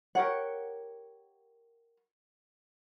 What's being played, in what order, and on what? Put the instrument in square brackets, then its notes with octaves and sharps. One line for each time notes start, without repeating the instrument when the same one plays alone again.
[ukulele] G4 A#4 C#5 F#5